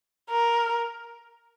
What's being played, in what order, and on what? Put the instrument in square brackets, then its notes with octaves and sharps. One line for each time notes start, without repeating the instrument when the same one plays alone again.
[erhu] A#4